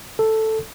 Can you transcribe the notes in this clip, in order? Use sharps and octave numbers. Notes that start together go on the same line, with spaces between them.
A4